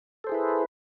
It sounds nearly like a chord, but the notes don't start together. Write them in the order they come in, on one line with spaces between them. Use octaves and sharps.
A4 C5 G#4 E4 B4